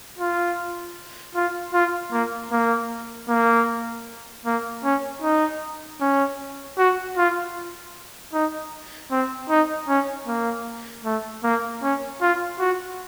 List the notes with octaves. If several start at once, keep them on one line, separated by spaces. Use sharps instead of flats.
F4
F4
F4
A#3
A#3
A#3
A#3
C#4
D#4
C#4
F#4
F4
D#4
C4
D#4
C#4
A#3
A3
A#3
C#4
F4
F#4